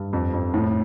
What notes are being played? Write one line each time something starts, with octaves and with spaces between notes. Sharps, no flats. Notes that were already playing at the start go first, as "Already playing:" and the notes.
Already playing: G2
F2
F2
A2